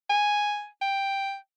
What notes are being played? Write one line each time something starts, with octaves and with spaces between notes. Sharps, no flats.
G#5
G5